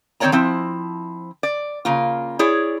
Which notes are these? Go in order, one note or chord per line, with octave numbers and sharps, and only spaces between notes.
D#3 C4 C#4 C#5 D5 A#5
F3 C4 E4
D5
C#3 A#3 F4
E4 G#4 C#5 D5